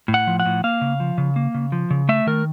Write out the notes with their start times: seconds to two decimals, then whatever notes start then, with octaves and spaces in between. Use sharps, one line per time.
0.08 A2
0.14 F#5
0.27 F3
0.40 F#5
0.46 A2
0.64 A#3 F5
0.81 C#3
1.00 F3
1.18 C#3
1.36 A#3
1.55 C#3
1.72 F3
1.91 C#3
2.09 A3 E5
2.27 D#3 A#4